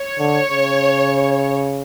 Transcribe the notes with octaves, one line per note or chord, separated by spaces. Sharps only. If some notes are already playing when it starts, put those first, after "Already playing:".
Already playing: C#5
D3
C#3